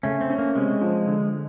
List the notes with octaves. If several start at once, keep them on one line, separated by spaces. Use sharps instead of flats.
C#3 A3 C#4
C4
C#4
A#3
C3 G#3
F3
D3